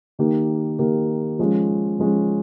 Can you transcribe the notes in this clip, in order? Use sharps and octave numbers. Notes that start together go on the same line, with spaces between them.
D#3 A#3 D#4 G4 A#4
D#3 A#3 D#4 G4 A#4
F3 G#3 C#4
F3 G#3 C#4